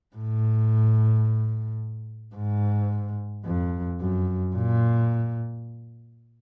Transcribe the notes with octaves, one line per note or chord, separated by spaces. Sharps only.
A2
G#2
F2
F#2
A#2